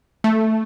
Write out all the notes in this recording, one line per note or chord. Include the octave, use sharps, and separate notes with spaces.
A3